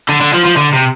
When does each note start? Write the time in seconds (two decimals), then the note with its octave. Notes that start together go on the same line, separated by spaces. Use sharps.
0.09 D3
0.21 D3
0.34 F3
0.45 F3
0.57 D3
0.73 C3